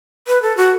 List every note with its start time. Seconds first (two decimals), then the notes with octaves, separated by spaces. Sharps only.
0.27 B4
0.42 A4
0.57 F#4